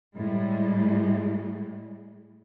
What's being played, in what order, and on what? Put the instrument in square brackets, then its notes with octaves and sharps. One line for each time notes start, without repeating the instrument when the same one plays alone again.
[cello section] A2 G3 G#3